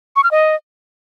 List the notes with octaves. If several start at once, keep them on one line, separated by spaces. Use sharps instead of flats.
C#6
F6
D#5